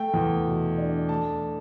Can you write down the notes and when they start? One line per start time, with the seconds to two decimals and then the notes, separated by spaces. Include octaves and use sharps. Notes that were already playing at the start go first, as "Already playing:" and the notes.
Already playing: A3 G5
0.14 E2
0.46 B2
0.78 D4
1.09 A3 A5